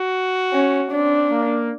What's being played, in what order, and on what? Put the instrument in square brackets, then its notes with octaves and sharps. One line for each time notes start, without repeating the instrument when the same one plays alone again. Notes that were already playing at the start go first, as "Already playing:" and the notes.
Already playing: [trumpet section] F#4
[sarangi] C#4
[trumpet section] C4 [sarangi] D4
[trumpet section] A#3